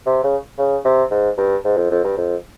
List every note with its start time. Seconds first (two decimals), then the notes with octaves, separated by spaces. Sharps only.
0.06 C3
0.24 C#3
0.58 C#3
0.85 C3
1.11 G#2
1.38 G2
1.64 G#2
1.77 F2
1.91 F2
2.04 G2
2.17 F2